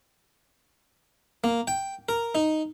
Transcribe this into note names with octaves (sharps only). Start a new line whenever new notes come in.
A#3
G5
A#4
D#4